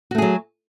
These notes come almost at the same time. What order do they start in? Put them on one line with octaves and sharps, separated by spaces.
F#4 A3 G#4 F#3